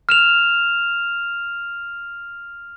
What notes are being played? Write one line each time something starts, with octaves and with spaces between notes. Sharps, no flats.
F6 E7 F7